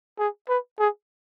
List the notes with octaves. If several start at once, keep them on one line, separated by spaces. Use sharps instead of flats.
G#4
B4
G#4